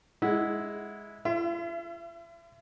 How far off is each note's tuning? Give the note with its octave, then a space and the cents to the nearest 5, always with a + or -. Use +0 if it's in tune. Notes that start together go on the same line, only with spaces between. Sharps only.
G#3 +0 E4 -10 F#5 +0
F4 -45 E5 +35